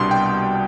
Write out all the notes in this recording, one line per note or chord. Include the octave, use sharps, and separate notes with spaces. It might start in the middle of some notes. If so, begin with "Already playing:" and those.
Already playing: C2 B2 G3 B3 D4 C6
G5